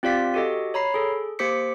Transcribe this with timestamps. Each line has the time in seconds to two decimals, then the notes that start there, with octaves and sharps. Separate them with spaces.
0.03 C4 F4 G4 D5 F5 B6
0.34 F#4 G4 A4 D#5
0.74 C#5 A#5 B5 C7
0.94 G#4 A4
1.39 A#3 G4 C5 D6 B6 C#7